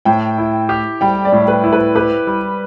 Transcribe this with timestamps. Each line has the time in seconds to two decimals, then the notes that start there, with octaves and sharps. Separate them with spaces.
0.05 A2 G5
0.38 E4
0.69 G4
1.01 G3 G5
1.25 D5
1.32 A2
1.48 B4
1.64 E4
1.72 B4
1.95 G4 B4
2.27 G3